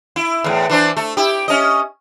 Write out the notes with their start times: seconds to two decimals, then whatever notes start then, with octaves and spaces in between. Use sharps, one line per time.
0.16 E4
0.44 E2 A2
0.70 E3 D4 C5
0.97 A3
1.17 E4 G4
1.48 C#4 D#5